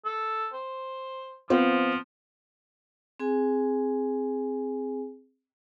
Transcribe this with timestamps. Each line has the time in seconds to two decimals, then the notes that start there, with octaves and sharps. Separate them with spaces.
0.05 A4
0.53 C5
1.50 F3 B3 C4 F4
3.20 C4 G#4 G#5